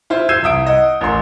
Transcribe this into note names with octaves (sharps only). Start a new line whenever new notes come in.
E4 F4 C5
E6 G6 G#6 C7 D#7 E7
C2 E5 D#6 D7
D#5 F#5
A1 A#4 C6